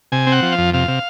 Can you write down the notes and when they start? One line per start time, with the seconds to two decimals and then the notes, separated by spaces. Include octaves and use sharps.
0.12 C3 G#5
0.27 C4
0.32 F#5
0.42 F3
0.52 F5
0.58 F2
0.74 C3 F5
0.88 C3